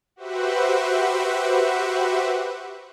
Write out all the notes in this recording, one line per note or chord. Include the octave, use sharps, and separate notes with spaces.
F#4 G4 B4 C5 E5 F#5